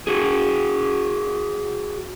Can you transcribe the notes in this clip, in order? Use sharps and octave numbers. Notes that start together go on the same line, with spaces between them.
F#4 G#4